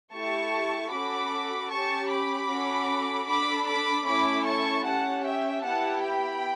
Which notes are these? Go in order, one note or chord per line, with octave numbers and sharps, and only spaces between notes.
A3 E4 G4 A5 C#6
C#4 F#4 A4 B5 D6
C#4 G4 A5 C#6
B5 D6
C#4 F#4 A4
D4 A4 B5 D6
B5 D6
A3 C#4 E4 A4 B5 D6
A5 C#6
C#4 G4 F#5 A5
E5 G5
B3 E4 G4 F#5 A5
G5 B5